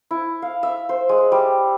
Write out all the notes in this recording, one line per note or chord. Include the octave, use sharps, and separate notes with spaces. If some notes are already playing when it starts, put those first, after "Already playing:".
E4
F5
E5
C5
G#3
G3